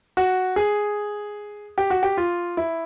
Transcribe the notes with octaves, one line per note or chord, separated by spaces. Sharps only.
F#4
G#4
G4
F#4
G4
F4
E4